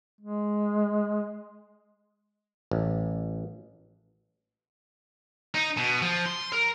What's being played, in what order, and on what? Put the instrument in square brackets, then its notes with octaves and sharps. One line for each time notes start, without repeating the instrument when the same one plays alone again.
[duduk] G#3
[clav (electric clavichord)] A1
[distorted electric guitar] D#4
B2
F3
C6
A#4